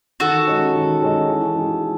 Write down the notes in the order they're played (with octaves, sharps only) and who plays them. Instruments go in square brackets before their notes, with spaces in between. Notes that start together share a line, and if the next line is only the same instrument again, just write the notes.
[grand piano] D#3 [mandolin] F#4 A4
[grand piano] G#3 C#4 G#4 D#5
D#3
G#3 C#4 G#4 D#5
E3
G#3 D#4 G#4
E3